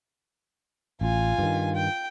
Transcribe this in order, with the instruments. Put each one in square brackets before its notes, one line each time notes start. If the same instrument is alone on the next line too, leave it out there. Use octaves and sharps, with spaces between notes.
[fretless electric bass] A1 [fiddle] F4 G#5
[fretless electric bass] G2 D#3
[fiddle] G5